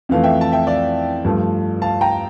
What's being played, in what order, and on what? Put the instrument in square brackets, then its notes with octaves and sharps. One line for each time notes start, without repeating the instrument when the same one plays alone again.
[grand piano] F2 E3 A3 F5
E5 G5
A5
E5 G5
D5 F5
G2 F3 A3
F5 A5
G5 A#5